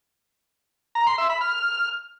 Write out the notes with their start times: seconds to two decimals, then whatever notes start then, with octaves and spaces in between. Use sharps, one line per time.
0.95 A#5
1.07 C6
1.18 E5
1.30 B5
1.41 F6